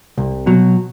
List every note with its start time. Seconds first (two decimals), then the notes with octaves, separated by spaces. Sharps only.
0.18 C2
0.46 B2 F#3